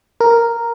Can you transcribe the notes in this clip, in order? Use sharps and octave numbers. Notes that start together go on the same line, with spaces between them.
A#4